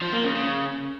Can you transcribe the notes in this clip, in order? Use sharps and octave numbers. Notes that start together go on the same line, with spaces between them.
F3
A#3
C#3
C#3